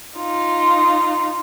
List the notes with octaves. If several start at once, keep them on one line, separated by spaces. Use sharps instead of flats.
D#4 F4